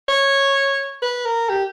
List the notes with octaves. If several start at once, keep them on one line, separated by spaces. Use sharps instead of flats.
C#5
B4
A#4
G4